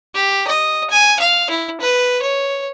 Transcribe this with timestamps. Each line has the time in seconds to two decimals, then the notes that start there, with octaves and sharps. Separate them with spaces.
0.15 G4
0.47 D#5
0.90 G#5
1.20 F5
1.50 E4
1.80 B4
2.22 C#5